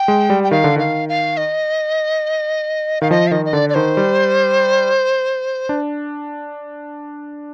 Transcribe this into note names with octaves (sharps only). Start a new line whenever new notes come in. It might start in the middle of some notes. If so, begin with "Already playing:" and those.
Already playing: G5
G#3
G3
G5
D#3 F5
D3
D#3 F5
F5
D#5
D#3 F5
F3 D#5
F5
D#3 D#5
D#5
D3 D5
D5
D#3 C5
G3
D4